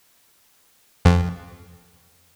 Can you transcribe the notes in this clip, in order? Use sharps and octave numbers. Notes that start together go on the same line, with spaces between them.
F2